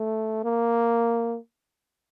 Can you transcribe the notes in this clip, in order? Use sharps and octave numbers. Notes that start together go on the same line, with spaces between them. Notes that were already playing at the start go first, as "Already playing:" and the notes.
Already playing: A3
A#3